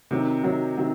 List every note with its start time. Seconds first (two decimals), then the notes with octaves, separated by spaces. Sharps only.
0.11 C3 D#3 F#3
0.43 C3 D#3 F#3
0.77 C3 D#3 F#3